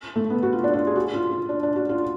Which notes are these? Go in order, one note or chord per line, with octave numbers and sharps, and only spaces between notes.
A3
B3
F#4
F4
D4
F4
G#4
F#4
F4
F4
D4
D4
F#4
F4